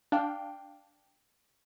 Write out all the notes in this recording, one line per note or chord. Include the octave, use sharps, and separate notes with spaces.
D4 F5 G5